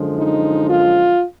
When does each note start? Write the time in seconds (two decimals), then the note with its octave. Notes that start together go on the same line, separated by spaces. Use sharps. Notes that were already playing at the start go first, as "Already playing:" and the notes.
Already playing: F#2 D3 F3 G#3
0.17 D#4
0.69 F4